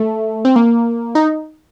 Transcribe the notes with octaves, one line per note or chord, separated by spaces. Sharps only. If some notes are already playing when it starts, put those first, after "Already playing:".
Already playing: A3
C4
A#3
D#4